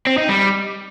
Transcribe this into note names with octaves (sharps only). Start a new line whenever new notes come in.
C4
D#4
G3